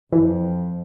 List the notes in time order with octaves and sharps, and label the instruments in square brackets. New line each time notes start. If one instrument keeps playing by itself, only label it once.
[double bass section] F2 [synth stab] E3